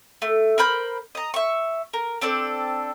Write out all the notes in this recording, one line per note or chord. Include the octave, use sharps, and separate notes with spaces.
A3
A#4 C5 B5 G6
D#5 A#5
E5 C#6
A#4
C4 D4 A4 D5